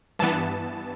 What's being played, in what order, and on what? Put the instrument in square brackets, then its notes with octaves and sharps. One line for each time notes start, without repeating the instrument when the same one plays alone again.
[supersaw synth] G2 E3 B3 A5